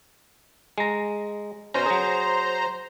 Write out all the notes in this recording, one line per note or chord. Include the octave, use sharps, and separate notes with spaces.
G#3 A#5
B2 C#4 C5 A#5
F#3 G#4